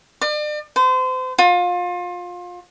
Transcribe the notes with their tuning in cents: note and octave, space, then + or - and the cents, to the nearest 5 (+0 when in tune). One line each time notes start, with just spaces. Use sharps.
D5 +40
C5 -35
F4 +25